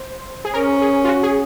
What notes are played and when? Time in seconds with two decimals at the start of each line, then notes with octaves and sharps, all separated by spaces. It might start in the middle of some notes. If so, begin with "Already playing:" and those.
Already playing: C5
0.45 G#4
0.54 C#4 A#4
0.82 G#4
1.05 F4
1.08 F#4
1.23 G#4